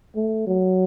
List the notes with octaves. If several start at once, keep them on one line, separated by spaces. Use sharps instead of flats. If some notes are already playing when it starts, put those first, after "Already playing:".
A3
F#3